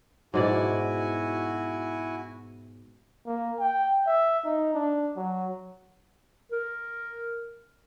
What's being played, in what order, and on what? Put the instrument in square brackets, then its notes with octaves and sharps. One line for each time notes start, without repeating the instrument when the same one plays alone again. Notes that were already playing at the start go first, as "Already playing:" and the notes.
[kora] G#2 B2 D5 [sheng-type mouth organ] E4 F#4 G#5
[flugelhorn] A#3
G5
E5
D#4
D4
F#3
[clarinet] A#4